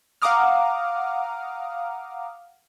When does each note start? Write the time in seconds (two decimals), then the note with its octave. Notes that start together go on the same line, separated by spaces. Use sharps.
0.22 F5 F#5 A#5 D6 D#6 F6